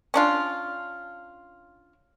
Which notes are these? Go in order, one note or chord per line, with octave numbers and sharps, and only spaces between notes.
C#4 D4 F4